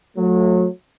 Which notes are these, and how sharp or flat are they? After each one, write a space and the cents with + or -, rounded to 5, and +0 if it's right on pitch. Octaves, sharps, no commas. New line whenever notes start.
F#3 -30 A3 +0